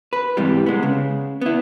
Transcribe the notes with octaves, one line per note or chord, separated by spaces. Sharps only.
B4
G#2 C3 E3 G3
G#3 B3
C#3
B3 E4